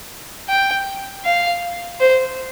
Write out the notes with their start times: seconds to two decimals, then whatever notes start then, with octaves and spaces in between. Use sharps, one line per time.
0.49 G5
1.25 F5
2.00 C5